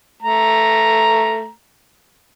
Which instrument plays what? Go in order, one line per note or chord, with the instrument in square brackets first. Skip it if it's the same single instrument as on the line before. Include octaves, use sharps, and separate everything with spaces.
[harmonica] A3 A#5